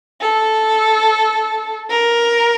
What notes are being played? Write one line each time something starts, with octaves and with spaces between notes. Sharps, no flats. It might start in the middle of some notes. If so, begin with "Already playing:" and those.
A4
A#4